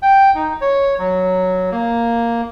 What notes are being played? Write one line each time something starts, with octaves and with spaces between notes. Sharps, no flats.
G5
D#4
C#5
F#3
A#3